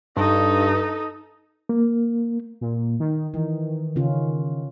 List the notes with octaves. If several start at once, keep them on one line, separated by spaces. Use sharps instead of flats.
G2 D#4 A4
A#3
A#2
D#3
D#3 E3
C#3 C#4 F4